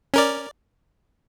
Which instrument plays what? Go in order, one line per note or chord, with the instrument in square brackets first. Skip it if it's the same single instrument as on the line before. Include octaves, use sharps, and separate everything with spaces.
[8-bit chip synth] C#4 A#4 D5